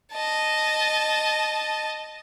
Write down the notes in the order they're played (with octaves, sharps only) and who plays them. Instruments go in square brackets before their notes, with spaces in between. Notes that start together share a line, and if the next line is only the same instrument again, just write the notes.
[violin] D#5 A5